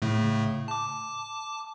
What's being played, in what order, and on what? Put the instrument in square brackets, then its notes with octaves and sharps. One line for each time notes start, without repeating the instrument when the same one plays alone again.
[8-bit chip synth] A2 C#3 A3
A5 D6